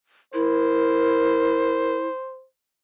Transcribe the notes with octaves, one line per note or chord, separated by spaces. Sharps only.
E4 A#4 C5